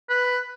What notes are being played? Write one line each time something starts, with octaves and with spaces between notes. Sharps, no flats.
B4